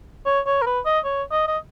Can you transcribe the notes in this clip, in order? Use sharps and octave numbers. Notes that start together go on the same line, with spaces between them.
C#5
C#5
A#4
B4
D#5
C#5
D#5
D#5